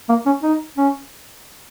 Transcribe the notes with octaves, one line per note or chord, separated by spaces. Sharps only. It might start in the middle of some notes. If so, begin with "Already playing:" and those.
A#3
C#4
D#4
C#4